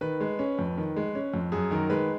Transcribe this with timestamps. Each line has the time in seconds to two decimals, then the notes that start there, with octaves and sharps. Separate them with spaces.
0.01 D#3 B4
0.20 G#3
0.39 C#4
0.59 F2
0.78 D#3
0.96 G#3
1.15 C#4
1.34 F2
1.52 F#2 G#4
1.71 D#3 A#4
1.90 G#3 B4